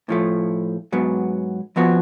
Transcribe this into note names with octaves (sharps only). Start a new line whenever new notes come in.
A2 F3 A3
G#2 F#3 B3
F2 F3 B3 F#4